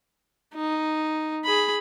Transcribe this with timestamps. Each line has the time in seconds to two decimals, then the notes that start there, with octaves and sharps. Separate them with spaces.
0.54 D#4
1.45 G#4 B5